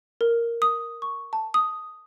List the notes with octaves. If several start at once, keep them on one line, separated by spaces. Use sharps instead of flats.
A#4
D#6
C#6
A5
D#6